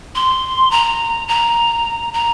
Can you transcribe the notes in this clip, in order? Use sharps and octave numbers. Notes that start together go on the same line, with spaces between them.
C6
A#5
A#5
A#5